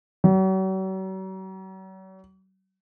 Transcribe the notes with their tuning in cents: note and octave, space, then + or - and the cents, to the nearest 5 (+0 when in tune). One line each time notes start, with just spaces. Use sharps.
F#3 +45